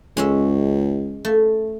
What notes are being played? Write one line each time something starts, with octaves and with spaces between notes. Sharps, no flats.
C#2 G#3 C#4 E5
A3